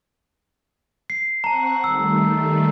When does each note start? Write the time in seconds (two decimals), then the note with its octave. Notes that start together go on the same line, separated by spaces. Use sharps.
1.10 C7
1.44 C4 F#5 A5 A#5 C#6
1.84 D#3 G3 A3 E6